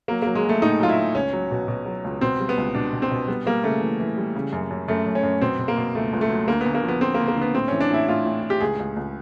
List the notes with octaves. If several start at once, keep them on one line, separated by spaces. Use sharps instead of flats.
F#3 A#3
A#3
F#3
G#3
F#3
A3
A2 D#4
F#3 F4
E4
F#3
C#2 C#4
F#3
B2
B2
F#3
C#2
B2 C4
G3
B3
C#2
B2 D4
B2
C4
B2
G3 B3
G3 A#3
C#3 A3
E3
E3
G3
C#3
F#2
F#2
F#2 A3
F#2
C#4
F#2
B2 C4
B2
A#3
B2
C#2 A3
C#2
A3
F#3
D2 A#3
B3
D2
A#3
F3
B3
D3 C4
A#3
D2
A#3
D3 B3
A2 C4
E3 C#4
D4
A2 E4
A2 F4
A2
A2
G4
C#2 G#4
C#2
C#2